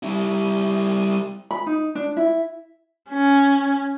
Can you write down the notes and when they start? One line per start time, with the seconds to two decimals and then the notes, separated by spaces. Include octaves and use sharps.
0.03 G3 E4
1.51 B5
1.66 D#4
1.95 D4
2.17 E4
3.10 C#4